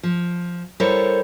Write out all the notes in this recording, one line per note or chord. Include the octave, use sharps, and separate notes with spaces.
F3
G3 E4 A4 A#4 C5 C#5